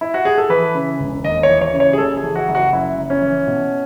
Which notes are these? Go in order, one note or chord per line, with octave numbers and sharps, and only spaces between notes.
E4
F#4
G#4
A4
E3 B4
C#3
E1
D#2 D#5
C#5
E3
C#5
C#3
C#5
G#4
F#1 A4
G#4
E3
F#4
F#1
F#4
F#2 E4
F#1
C#4
E3
B2